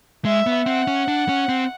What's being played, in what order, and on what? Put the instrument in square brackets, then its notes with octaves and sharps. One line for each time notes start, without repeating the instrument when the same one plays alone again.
[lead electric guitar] G#3 [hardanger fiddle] E5
[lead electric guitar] B3
[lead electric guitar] C4 [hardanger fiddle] F#5
[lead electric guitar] C#4
D4
C#4
C4